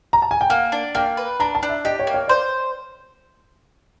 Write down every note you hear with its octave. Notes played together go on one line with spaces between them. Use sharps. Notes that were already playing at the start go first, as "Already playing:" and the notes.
A#5
A5
G#5
G5
A#3 F#5
D4
A#3 G5
B4
D4 A#5
A5
D4
E5
G4 D#5
C#5
A#3
C#5
C5 D5